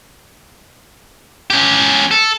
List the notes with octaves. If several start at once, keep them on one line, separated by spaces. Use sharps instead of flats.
C#4 G4
A4